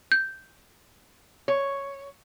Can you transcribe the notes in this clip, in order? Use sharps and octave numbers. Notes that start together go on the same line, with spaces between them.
G6
C#5